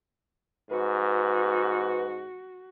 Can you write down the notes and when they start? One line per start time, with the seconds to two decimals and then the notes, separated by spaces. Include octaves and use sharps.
0.71 G#2 F#4 B4